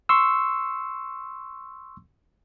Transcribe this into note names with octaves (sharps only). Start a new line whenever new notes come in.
C6 C#6 E6